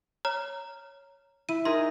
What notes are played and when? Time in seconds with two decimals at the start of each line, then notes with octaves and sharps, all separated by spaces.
0.25 C#5 A#5 F6
1.49 E4 D#7
1.65 D#4 G#4 A#4 C6